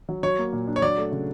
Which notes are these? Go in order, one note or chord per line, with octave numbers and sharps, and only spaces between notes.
F#3
F#3 C#5
A#3
A#2
D4
C#5
F#3 D5
A3
C#3